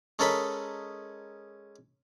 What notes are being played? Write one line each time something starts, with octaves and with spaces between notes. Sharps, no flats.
G#3 C#4 A4 A#4 D#5 B5